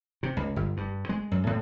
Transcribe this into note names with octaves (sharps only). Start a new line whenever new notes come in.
C3
C#2
G1
G2
G#3
F#2
A2